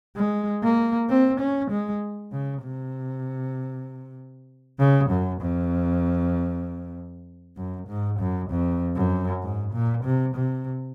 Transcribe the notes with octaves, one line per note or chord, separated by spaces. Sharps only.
G#3
A#3
C4
C#4
G#3
C#3
C3
C#3
F#2
F2
F#2
G#2
F#2
F2
F#2
G#2
A#2
C3
C3